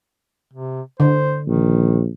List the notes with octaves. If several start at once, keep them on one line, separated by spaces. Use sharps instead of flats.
C3
D3 C5
A#1 D#3